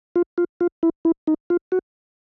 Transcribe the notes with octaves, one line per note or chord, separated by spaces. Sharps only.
F4
F4
F4
E4
E4
D#4
F4
F#4